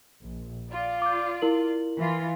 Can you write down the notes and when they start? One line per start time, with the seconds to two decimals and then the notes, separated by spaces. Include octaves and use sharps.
0.22 A#1
0.70 F4 D5
1.02 D6 G6
1.42 E4 A#4 F#7
1.98 E3 F4